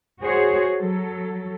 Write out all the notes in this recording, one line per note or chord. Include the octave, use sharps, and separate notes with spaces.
F#4 G#4 C5 C#5
F#3 A4